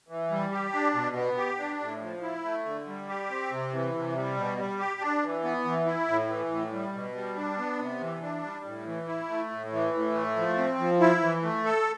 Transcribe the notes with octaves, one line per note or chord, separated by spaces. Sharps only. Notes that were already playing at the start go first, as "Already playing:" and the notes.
E3
G3
G4
D4
B2
B3
G4
D4
A2
F3
E4
A3
D3
G3
G4
C4
C3
E3
C3
G3
B2
G3
G4
D4
E3
B3
E3
E4
A2
E3
A2
G3
B2
G3
D4
B3
C3
E3
D4
G3
A2
E3
E4
A3
A2
E3
A2
A3
F3
C4
F3
E4
E3
A3
A4